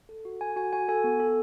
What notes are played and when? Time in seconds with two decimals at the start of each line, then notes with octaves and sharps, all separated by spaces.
0.09 A4
0.25 F#4
0.41 A4 G#5
0.56 F#4 G#5
0.73 F#4 G#5
0.89 A4 G#5
1.04 B3
1.20 A4